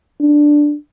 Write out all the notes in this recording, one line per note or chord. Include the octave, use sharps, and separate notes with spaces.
D4